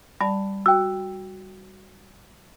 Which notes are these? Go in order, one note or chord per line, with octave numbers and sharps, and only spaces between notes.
G3 D5 A5 B5
F#4 G5 E6